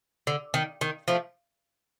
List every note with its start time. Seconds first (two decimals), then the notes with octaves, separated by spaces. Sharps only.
0.27 D3
0.54 D#3
0.81 D#3
1.08 F3 A3